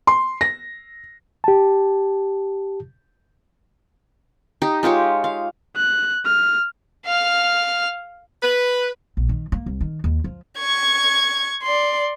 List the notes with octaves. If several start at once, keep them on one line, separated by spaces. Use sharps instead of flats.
C6
A#6
G4 A5
D#4 G4
G#3 F4 G4 C#5
F5
F#6
F6
F5 F6
B4
A#1
D#3
A#3
C2
D#3
D#2
F3
C#6 G#6
D5 C6